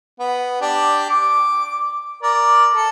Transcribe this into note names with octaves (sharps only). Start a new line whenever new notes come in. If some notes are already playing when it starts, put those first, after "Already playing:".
B3
D4 G4
D6
A#4 D5
A4